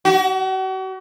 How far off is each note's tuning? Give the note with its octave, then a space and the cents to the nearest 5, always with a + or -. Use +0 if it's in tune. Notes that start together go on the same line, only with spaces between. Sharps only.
F#4 +40